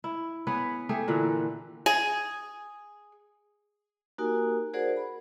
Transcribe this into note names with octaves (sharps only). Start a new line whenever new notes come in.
E4
B3 G#4 B4 C#5
A3 G4 G#4
A#2 D3 E3
G#4
A#3 D#4 F#4 G4 A#4 G#5
F#4 G#4 A#4 C5 D5 F#5
B5